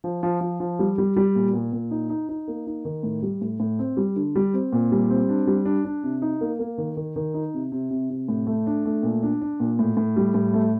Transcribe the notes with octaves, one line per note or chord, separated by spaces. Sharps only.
F3
F3
F3
F3
G3
G3
G3
A#2
A#2
A#2
D#4
D#4
D#4
A#3
D#4
D#3
A2
G3
A2
A2
C4
G3
D3
G3
C4
A#2
G3
C4
D4
G3
D4
D4
C3
D#4
A#3
A#3
D#3
D#3
D#3
D#4
C3
C3
C3
C3
A2
A3
D4
A3
A#2
D4
D4
A#2
A2
A2
G3
A2
A3